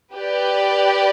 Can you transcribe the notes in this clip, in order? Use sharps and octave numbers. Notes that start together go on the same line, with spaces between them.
G4 B4 D5